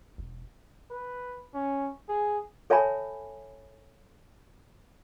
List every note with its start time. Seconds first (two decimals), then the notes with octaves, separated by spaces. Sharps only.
0.18 E1
0.91 B4
1.53 C#4
2.08 G#4
2.70 A4 C#5 E5 G#5 A5 B5